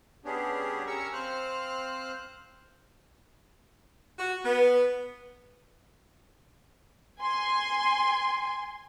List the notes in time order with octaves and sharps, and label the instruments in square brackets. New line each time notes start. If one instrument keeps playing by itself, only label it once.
[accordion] G3 B3 C#4 D4 G4 G#4
G3 C#4 A#4 A#5 C#6 E6
C4 C5 F5 F6 F#6
[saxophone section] F#4
B3
[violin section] G#5 C6